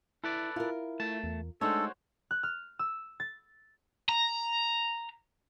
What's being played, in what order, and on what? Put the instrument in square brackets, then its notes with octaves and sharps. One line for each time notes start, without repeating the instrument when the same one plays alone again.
[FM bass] E4 [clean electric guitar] A4 B4 D5
[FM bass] E4 [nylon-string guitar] F4 A#4
[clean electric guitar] A3 A5
[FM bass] E2
[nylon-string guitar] G#3 A3 D#4 [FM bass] D4 [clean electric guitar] F#4 C5 C#5 [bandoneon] A4
[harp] F#6
F6
E6
A6
[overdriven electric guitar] A#5